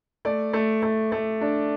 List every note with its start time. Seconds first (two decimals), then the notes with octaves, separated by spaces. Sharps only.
0.25 A3 D5
0.53 A3
0.83 A3
1.12 A3
1.41 D4